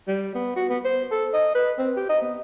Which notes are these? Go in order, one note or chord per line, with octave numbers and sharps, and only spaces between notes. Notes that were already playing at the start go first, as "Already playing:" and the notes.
G3
B3
F#4
B3
C5
A4
D#5
B4
C4
G4
D#5
B3